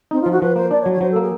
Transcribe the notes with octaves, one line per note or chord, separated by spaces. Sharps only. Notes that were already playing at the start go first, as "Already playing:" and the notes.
C4 D#4
F4
F3
F#4
F3 B4
A#3 C5
D4 D5
C#5
F#3
C#5
F#3 C5
A4
A#3
G#4